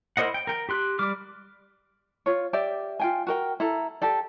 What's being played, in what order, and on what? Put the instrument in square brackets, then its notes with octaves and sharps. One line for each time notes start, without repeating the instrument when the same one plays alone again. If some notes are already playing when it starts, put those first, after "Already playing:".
[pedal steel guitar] E4 A#4 C5 D#5 F#5
G5
A#4 G5
G4 C6 F#6
G3 D6 F6
[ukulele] F4 C#5
G4 D5 E5
F4 G5 G#5
F#4 A#4 G5
E4 A4 A#5
G4 A4 D5